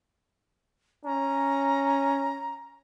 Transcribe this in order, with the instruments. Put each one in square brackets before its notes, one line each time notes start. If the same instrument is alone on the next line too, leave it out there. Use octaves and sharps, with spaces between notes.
[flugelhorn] C#4 [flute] A#5